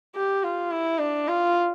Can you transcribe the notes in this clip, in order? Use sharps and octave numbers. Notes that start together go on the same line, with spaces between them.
G4
F4
E4
D4
F4